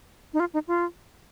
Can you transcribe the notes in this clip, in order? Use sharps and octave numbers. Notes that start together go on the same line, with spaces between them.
D#4
F4
D#4
F4